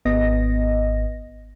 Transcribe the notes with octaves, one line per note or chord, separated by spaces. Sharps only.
G#1 B3 D#5 A#6